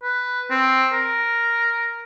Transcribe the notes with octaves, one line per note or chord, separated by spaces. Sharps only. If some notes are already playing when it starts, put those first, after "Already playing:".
B4
C4
A#4